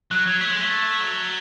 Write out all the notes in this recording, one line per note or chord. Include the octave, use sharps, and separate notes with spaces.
F#3 F#6
F#3 G#6
A3 B6
G#3
B6
A3
A6
F#3